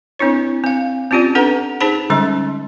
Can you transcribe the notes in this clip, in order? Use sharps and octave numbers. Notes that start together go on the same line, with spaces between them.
C4 D4 E4 C#5
C4 F5
C4 C#4 F4 G4 D5
D4 A4 B4 F#5 A#5
D#4 G#4 C5 A5 B5
D3 G3 G#3 C#4 C6